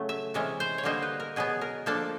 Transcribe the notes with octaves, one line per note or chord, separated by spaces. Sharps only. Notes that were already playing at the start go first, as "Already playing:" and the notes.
Already playing: C#3 F#3 A3
E5
C3 E3 G#3 C#4 E5
C5
C#5
D3 G3 A#3 D#4 C5
B4
A#4
B2 F#3 B3 G#4
A#4
F3 A#3 D4 A4